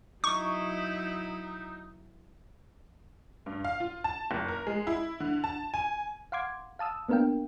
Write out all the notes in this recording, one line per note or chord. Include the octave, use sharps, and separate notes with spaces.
F#3 D#4 E4 C#6
G2
F5
F4
A5
F#1
A#4
G#3
E4
D3
A5
G#5
F5 F#5 C6 D6 G#6
F5 A5 D#6 E6
A#3 B3 D4 A#4 F5 G5